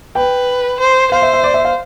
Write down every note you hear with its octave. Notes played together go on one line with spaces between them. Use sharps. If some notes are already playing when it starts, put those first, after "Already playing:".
B4 G5
C5
C5 F5
E5
E5
D5
E5
F5